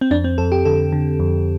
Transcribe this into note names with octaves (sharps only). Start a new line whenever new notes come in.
C4
F2 D4
C4
F2 A4
G4
D3 A4
D3
F2